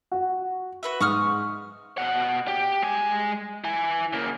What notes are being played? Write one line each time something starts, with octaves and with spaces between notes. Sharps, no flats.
F#4
F#4 B4 E5
G#2 C#6 D#6 F6
B2 F#5
G4
G#3 G#5
E4 G#5
C#3 A#3